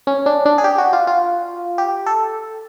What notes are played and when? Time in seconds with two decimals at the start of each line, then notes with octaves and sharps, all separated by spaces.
0.07 C#4
0.26 D4
0.46 D4
0.58 G#4
0.64 G4
0.78 F#4
0.93 F4
1.07 F4
1.78 G4
2.06 A4